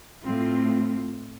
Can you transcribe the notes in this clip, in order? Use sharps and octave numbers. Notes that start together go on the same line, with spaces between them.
A2 C4 F4